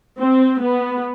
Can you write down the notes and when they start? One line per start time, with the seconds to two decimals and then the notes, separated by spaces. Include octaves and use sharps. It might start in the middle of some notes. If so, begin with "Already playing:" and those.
0.18 C4
0.62 B3